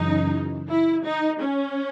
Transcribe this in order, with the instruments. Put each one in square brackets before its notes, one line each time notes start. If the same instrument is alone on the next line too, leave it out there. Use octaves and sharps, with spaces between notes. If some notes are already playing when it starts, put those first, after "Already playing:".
Already playing: [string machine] F#2 C#3 E3 [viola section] D#4
[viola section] E4
D#4
C#4